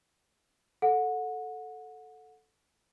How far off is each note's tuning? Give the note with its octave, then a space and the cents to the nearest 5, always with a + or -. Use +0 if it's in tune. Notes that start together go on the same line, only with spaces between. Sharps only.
A4 +0 F#5 -25